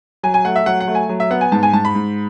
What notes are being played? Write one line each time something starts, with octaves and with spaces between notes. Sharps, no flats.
F#3 G#5
G#5
A3 F#5
E5
F#3 F#5
F#5
A3
G#5
F#3
E5
B3 F#5
G#5
G#2 A5
G#5
G#2 A5
B5
G#2